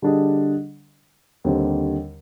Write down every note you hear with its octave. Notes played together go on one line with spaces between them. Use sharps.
D3 G3 D4 G#4 D#5
D#2 D3 G3 C4